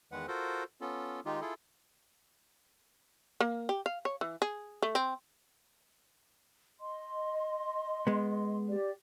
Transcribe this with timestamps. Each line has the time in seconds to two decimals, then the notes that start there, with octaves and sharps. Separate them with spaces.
0.12 E2 D#3 G#3 B4 F#5
0.28 F4 F#4 A4 A#4 C5
0.81 B3 C#4 F4 A4
1.25 D#3 G#3 D#4 F4 G4
1.41 E4 F4 G#4 A4
3.41 A#3
3.69 G4
3.86 F5
4.05 C#5
4.21 E3
4.42 G#4
4.83 A3
4.95 C4
6.80 D#5 C6
8.07 G#3 B3
8.69 G4 D5